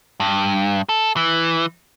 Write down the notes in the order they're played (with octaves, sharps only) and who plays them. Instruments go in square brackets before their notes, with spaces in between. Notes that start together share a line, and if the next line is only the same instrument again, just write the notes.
[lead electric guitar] G2
A4
E3